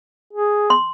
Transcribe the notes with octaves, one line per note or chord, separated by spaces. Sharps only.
G#4
C6